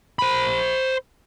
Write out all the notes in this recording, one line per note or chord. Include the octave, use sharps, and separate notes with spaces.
C5 B5